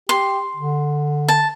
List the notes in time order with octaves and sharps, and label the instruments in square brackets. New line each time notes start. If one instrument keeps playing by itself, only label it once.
[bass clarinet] G4 [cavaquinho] C6
[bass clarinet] D3
[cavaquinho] A5